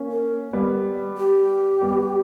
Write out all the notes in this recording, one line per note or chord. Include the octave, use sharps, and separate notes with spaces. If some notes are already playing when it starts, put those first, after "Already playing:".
Already playing: A#3 C#4
A#4
G3 B3
G4
G3 B3